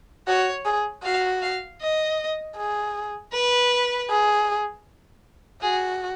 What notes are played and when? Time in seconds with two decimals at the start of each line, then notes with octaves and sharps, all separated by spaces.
0.27 F#4 C#5
0.65 G#4
1.04 F#4 F5
1.42 F5
1.81 D#5
2.57 G#4
3.33 B4
4.10 G#4
5.62 F#4 G#4